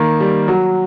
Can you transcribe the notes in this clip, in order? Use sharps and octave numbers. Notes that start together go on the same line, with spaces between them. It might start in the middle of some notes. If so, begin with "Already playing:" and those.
Already playing: D#3 A#3
G3
F#3